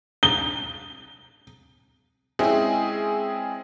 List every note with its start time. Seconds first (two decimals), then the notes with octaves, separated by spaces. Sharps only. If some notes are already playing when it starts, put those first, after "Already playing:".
0.23 G7
2.39 G#3 C4 C#4 E4 G#4